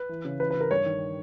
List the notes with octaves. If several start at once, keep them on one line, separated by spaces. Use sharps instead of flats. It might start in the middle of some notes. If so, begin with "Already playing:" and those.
Already playing: B4
E3
C#3
E3 B4
B4
C#3
A#4
G2 C#5
D#3